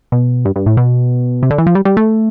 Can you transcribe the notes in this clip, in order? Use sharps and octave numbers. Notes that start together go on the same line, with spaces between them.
B2
G2
G2
A2
B2
C3
D3
E3
F3
G3
G3
A3